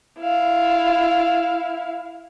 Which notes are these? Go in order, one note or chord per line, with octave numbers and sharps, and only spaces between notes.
E4 F5